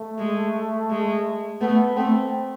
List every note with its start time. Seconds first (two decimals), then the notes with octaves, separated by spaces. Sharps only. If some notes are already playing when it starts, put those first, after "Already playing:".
Already playing: A3
0.19 G#3
0.90 G#3
1.61 A3 B3
1.96 A3 C4